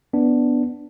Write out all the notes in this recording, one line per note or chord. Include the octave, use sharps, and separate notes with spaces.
B3 D4